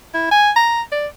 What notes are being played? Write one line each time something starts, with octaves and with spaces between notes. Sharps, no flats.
E4
G#5
A#5
D5